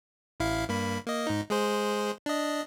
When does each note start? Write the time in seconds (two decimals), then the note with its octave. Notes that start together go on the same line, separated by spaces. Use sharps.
0.40 A1 E4 F5
0.69 G2 A#3 B5
1.06 A#3 D#5
1.27 G#2 D#4
1.50 G#3 G#4 C5
2.26 D4 D#5